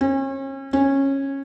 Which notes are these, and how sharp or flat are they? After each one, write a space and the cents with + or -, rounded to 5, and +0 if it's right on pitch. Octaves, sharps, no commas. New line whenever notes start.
C#4 -35
C#4 -15